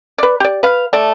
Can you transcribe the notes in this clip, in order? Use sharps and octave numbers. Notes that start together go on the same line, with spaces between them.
B4 D5
G4 D5
B4 F5
A3 D5